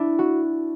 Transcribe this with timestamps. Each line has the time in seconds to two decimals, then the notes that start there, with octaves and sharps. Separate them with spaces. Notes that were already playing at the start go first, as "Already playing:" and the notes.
Already playing: D4 E4
0.19 F#4